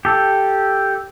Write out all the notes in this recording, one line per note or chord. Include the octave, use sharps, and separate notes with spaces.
G4 A4